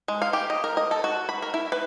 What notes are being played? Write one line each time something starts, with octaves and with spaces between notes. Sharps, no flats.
G#3
F5
G4
D#5
A#4
D#5
A4
F#4
B5
A#4
E4
B4